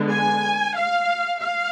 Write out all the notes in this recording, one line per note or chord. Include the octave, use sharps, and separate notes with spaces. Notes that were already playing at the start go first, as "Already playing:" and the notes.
Already playing: D3 G#3 B3
G#5
F5
F5